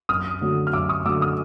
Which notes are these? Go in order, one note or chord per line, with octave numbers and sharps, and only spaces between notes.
F#2 D#6 F6
D3 F#3 A3
F6
F#2 D6 E6
C#6 D#6
D3 F#3 A3 D6 E6
D#6 F6